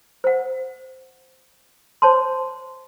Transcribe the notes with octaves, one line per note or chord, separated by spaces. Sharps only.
C5 F#5
C5 C#5 A5 C6